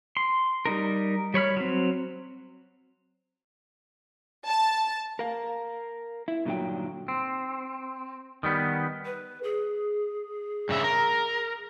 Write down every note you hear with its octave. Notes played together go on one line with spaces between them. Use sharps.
C6
G3 D#4 A#4
G3 C#5 B5 F6
F#3 C4
A5
A#4 F5
E4
G2 A#2 D3 F#3 D#4 G5
C4
D#3 G3 B3
B4
G#4
G2 C#3 E5
A#4